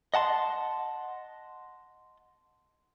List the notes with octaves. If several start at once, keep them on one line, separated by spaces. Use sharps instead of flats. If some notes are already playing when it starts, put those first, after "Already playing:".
D#5 F#5 A5 C6